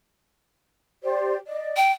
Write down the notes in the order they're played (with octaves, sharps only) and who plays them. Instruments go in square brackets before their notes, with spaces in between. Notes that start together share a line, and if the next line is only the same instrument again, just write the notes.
[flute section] G4 C5 D5
D5 D#5
[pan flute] G5